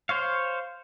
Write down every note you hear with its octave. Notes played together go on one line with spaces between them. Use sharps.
C5 C#5 F5